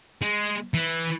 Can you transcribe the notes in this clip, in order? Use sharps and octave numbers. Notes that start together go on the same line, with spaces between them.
G#3
E3